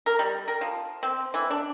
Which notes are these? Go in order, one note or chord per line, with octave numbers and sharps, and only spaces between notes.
A#4
G3
A#4
F3
C4
E3
D4